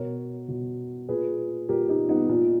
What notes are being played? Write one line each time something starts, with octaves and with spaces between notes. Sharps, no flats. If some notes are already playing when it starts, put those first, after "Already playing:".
Already playing: B2 A#4 C#5
B2
A#2 G#4 B4
A#2 G4 A#4
D#4 G4
B3 D#4
A#2